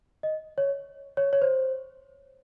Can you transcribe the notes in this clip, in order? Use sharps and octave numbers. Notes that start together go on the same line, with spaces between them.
D#5
C#5
C#5
C#5
C5